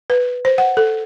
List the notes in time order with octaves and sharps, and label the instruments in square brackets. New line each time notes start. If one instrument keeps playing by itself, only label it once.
[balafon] B4
C5
F#5
A4